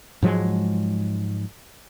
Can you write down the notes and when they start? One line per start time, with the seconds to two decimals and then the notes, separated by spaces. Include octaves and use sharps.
0.23 G#2 F3 F#3 G#3